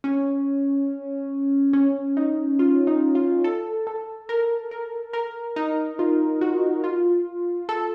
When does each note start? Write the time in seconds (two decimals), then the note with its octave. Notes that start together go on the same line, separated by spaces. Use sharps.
0.04 C#4
1.73 C#4
2.17 D#4
2.59 F4
2.87 D#4
3.15 F4
3.44 A4
3.87 A4
4.29 A#4
4.71 A#4
5.13 A#4
5.56 D#4
5.99 F4
6.41 F#4
6.84 F4
7.69 A4